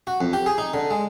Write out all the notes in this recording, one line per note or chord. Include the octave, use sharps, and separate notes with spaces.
F#4
F2
G4
G#4
D#4
D3
G#3